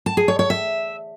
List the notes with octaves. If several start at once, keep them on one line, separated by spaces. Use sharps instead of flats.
A5
G#4
C#5
C#5
E5